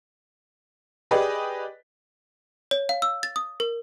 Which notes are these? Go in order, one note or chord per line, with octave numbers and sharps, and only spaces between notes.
G4 G#4 B4 D5 D#5
C#5
F5
E6
A6
D#6
A#4